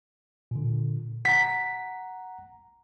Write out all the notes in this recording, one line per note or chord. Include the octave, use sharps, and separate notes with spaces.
A#2 D3
F#5 A#5 B6